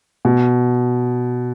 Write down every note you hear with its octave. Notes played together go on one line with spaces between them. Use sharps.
B2